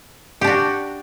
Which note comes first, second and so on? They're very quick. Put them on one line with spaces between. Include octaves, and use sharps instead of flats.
G4 D4 F#4